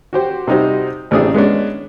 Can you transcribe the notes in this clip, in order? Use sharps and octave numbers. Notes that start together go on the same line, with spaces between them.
F#4 G4 C5
C3 G3 D#4 F#4 C5
A1 A3 C4 D4 G#4 D#6
G#3 B3 C#4 D4